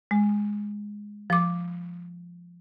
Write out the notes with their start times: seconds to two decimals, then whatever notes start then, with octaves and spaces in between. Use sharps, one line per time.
0.11 G#3
1.30 F3 D6